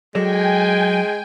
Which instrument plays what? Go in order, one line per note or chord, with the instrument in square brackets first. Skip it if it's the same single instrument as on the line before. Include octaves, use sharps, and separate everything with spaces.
[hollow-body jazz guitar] F#3 A4 D5 [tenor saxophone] G#3 [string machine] G5 G#5